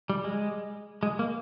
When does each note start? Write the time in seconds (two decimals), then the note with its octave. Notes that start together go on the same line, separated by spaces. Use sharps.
0.10 G3
0.24 G#3
1.03 G#3
1.19 A#3